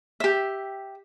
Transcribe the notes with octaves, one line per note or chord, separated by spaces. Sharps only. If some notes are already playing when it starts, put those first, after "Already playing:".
G4 E5